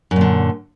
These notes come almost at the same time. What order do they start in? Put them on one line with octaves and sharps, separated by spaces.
F#2 A#2 D3